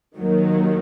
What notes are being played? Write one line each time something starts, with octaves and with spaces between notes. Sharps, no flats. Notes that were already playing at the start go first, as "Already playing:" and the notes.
D#2 D#3 F#3